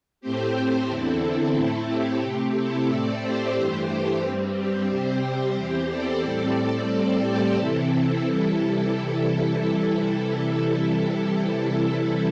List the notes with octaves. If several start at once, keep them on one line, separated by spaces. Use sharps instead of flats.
A2 A3 C4 G4 C5
E2 D3 C4 E4 A4
A2 A3 C4
G4
C3 A3 C4
E4 A4
A2 A3 C4 A4 D5
G4 C5
G2 E3 A3
G4
G2 G3 C4
G4
C3 G3 C4 G4 C5
E2 E3 C4
A4 D5
A2 G3 C4 A4 D5
A2 G3 C4 A4 D5
G4 C5
C3 E3 C4 E4 A4
C3 E3 G3